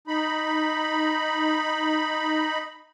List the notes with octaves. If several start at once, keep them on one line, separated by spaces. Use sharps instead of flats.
D#4 B5